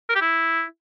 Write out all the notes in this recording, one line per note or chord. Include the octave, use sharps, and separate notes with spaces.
A#4
G4
E4